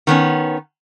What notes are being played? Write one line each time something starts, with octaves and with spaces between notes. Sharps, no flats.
D#3 B3 C#4